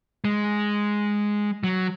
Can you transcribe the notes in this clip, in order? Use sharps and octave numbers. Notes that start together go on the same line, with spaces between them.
G#3
F#3